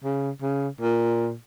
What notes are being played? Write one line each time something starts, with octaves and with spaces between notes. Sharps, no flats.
C#3
C#3
A#2